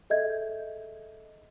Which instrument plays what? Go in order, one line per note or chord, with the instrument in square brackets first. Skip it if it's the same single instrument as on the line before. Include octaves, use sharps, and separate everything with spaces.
[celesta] G#4 A4 D#5 E5 G6 G#6